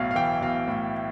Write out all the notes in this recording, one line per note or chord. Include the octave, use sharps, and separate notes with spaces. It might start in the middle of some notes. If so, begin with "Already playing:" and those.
Already playing: B1 A2 F5
F5
E3 G5
B1 F5
A2